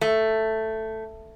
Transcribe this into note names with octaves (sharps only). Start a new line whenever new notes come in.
A3